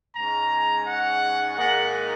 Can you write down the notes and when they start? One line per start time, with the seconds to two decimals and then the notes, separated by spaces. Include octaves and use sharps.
0.15 G#2 G#3 C#4 A#5
0.85 F#5
1.56 G#2 D#3 A#3 D#4 F#5